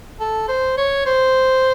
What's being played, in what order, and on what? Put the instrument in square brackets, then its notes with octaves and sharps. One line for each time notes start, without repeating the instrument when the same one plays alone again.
[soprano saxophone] A4
C5
C#5
C5